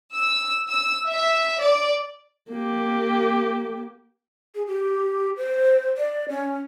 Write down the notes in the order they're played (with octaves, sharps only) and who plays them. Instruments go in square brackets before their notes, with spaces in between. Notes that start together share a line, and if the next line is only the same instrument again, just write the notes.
[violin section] E6
E6
E5
D5
[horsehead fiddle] A#3 G4
[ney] G#4
G4
C5
D5
C#4